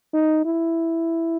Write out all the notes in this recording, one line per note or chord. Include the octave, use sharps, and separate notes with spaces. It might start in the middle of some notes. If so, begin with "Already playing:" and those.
D#4
E4